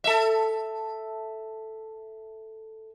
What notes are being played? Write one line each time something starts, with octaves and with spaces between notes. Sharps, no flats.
A4 E5